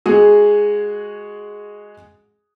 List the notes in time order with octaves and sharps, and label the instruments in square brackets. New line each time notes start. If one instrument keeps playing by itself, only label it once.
[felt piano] G#3 F#4 G#4